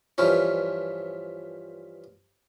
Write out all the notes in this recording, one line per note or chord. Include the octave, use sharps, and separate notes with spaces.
G2 E3 F3 C#4